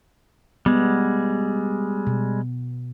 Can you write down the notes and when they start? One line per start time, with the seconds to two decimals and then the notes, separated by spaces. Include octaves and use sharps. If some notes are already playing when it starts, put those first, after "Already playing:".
0.66 G3 G#3 B3
2.07 B2